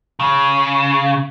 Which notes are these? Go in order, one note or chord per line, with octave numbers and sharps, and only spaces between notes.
C#3